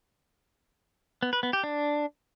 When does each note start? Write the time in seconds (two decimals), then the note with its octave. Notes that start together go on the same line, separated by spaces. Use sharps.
1.23 B3
1.33 B4
1.43 B3
1.53 G4
1.64 D4